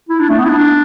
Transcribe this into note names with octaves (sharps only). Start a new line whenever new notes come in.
E4
D4
A3
B3
E4
D4